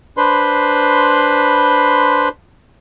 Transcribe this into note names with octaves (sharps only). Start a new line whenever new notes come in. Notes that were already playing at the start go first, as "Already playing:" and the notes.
D4 B4 C5 B5 C6